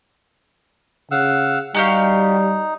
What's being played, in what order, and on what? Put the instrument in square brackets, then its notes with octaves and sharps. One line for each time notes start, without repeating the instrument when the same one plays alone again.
[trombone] C#3 [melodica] F5 F#5 E6
[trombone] G3 [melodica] D#4 [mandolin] F#4 G4 F5